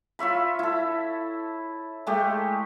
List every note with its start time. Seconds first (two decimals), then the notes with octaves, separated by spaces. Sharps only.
0.19 F4 C#5 E5 B5
0.59 E4 A4
2.07 G#3 A3 G4